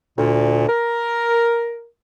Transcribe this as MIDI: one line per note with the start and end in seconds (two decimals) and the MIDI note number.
0.18 0.66 38
0.18 0.66 46
0.67 1.84 70